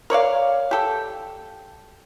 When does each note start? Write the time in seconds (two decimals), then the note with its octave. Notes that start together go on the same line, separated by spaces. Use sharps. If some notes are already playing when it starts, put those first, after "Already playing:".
0.10 A#4 C#5 D5 F5
0.71 G4 A4 G5